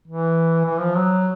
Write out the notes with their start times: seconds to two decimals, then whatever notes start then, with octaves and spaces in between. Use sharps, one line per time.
0.07 E3
0.65 E3
0.80 F3
0.96 F#3